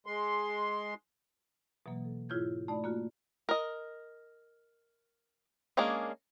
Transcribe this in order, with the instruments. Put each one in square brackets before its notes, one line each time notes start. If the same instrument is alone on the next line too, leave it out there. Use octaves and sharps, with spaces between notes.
[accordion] G#3 C6
[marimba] B2 E3 F#3 A#3
A4
G#2 E4 F4 C#5 G6 G#6
A3 D#4 D5 B5
A#3 F4 F#4
[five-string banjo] A#4 D#5
G#3 A#3 C#4 D4 G#4